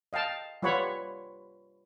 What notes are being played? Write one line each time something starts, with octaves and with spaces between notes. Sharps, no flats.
D#5 F5 G5 A5
G3 F4 B4 C#5 F#5 B5